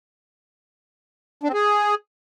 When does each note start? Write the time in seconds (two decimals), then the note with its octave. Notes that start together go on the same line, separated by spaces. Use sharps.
1.43 D4
1.49 C4
1.54 G#4